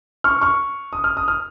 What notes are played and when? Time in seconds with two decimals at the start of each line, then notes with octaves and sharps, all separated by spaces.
0.24 C#6 F6
0.41 C#6 F6
0.93 D#6
1.04 F6
1.17 D#6
1.28 F6